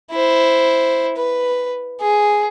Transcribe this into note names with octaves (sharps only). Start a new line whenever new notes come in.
E4 C5
B4
G#4